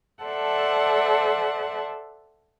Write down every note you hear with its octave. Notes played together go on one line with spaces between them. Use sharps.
A4 C5 D5 E5 F#5 A5